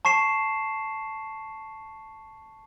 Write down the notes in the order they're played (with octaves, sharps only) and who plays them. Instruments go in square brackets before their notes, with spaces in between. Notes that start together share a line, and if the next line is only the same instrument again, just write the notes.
[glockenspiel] A5 C#6 C7 E7